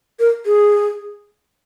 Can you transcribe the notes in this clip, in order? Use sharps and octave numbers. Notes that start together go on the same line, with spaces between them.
A#4
G#4